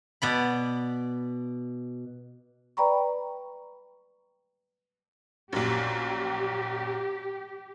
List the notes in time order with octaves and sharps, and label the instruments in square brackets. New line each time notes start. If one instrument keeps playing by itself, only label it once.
[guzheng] B2 D5 B5
[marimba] B4 D5 G5 A#5 B5 C#6
[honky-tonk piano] A#1 F#2 [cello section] G4